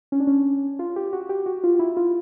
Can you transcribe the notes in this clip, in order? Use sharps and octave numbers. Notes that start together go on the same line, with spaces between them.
C#4
D4
C#4
F4
G4
F#4
G4
F#4
F4
E4
F4